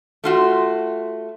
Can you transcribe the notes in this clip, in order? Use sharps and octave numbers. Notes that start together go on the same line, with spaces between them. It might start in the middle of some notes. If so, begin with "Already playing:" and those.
A3 F4 F#4